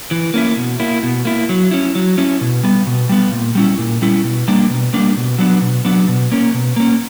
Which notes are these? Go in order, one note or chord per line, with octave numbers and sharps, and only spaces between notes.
E3
A#3 C#4 E4
B2
A#3 E4
B2
A#3 E4
F#3
C#4 E4
F#3
C#4 E4
B2
G3 B3
B2
G3 B3
A#2
G3 C#4 E4
A#2
G3 C#4 E4
B2
G3 A#3 D4
B2
G3 A#3 D4
B2
F#3 B3 D4
B2
F#3 B3 D4
B2
A#3 C#4
B2
A#3 C#4